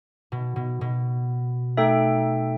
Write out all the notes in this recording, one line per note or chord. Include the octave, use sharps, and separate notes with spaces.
B2
B2
B2
A3 D#4 A4 E5 G5